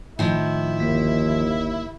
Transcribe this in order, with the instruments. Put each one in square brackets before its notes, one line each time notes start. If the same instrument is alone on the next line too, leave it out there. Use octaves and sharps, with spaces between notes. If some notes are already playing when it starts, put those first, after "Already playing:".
[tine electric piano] A2 [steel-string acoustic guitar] D#3 F3 [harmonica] E4
[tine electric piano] G1 A#3 B6 [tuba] D#2